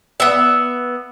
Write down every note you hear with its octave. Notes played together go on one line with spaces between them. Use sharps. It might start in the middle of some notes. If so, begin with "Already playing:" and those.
B3 E5